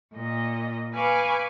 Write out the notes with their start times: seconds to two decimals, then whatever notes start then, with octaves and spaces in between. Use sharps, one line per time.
0.14 A#2 D#5
0.94 B4 F5 G#5 C#6 D6